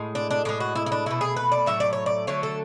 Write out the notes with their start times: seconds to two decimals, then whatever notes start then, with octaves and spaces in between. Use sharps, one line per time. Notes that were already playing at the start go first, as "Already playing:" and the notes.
Already playing: A2 G#3
0.15 D4
0.31 D4
0.45 A2 G#3 D4
0.60 F#4
0.75 E4
0.86 E4
0.92 D4
1.06 B2 A3 E4
1.21 G#4
1.36 B4
1.52 D5
1.66 A2 F#3 A3 E5
1.80 D5
1.93 C#5
2.06 D5
2.27 D3 F#3 A3 C#5
2.43 A4